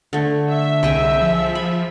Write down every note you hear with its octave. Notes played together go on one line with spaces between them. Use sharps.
D3 A3
E5
C2 G#4 D#5 G5
F3
B5